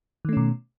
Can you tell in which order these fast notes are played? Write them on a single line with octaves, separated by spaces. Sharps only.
D#3 A3 C#4 B2